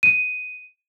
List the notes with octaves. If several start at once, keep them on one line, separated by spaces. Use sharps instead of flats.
D#7